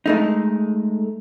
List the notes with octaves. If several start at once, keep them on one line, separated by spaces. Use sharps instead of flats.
G#3 A3 D#4